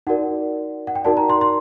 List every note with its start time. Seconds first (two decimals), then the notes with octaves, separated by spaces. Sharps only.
0.07 D#4 F#4 A#4 D5 F#5
0.87 F#5
0.95 G5
1.04 D#4 F#4 A#4 D5 A5
1.17 A#5
1.30 C6
1.41 C6